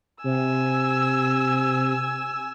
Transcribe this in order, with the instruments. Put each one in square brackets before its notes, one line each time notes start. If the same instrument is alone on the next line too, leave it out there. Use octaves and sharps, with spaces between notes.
[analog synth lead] C3 [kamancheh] G#5 E6